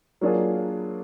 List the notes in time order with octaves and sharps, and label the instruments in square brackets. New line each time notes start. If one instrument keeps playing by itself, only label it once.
[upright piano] F#3 A#3 D4 F4 G#4